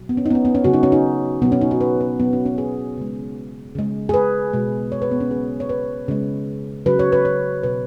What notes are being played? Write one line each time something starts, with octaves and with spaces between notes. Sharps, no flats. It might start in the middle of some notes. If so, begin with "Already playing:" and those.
Already playing: B2 F#3
B3
C#4
D#4
B3
C#4
B3
C#4
C#3 F#3 F#4
D#4
C#4
D#4
B2 F#3 B3
C#4
D#4
F#4
B4
B4
B2 F#3 B3
C#4
C#4
G#4
C#3 G#3
C#3 G#3
G#4
B4
B2 G#3
C#5
B4
B3
C#4
C#3 F#3 G#4
C#5
B4
C#3 G#3
C#3 F#3 B4
C#5
B4
C#5
B2 F#3 B4